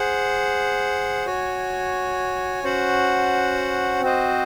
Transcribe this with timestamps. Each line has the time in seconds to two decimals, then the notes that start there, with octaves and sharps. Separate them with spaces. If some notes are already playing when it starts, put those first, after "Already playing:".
Already playing: G#4 C5 F#5
1.26 F#4 C#5 G#5
2.64 C#4 F#4 C5 F#5
4.02 C4 F#4 C5 D#5